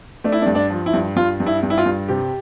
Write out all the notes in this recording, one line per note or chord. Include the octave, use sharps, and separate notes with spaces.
A3 D4
E4
D4
G2
D4
F3
E4
G2
G2 F4
G2
E4
G2
E4
F4
G2
C3 G4